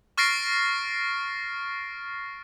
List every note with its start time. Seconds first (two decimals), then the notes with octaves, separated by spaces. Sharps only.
0.18 C#6 F6 A6 A#6 C7 D7